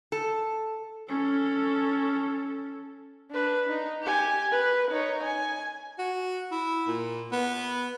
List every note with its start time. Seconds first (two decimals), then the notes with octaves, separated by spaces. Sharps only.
0.12 A4
1.09 C#4 A4
3.31 D4 B4
3.69 D#4
4.03 G4 G#5
4.52 B4
4.92 D#4 C#5
5.23 G#5
5.98 F#4
6.51 E4
6.87 A#2
7.32 B3